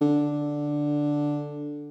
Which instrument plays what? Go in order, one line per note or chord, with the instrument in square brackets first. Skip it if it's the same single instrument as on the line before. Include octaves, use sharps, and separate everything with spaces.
[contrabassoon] D3